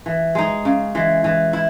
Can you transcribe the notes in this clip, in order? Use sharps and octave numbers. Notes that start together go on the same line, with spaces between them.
E3
G#3 D#4
C#3
E3 G#3
E3
E4